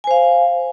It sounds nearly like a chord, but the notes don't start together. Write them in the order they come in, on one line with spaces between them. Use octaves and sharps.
G#5 C5 F5